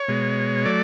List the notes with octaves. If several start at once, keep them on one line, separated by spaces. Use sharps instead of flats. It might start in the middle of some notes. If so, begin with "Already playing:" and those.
Already playing: C#5
B2 G#3
F#3 A3 D5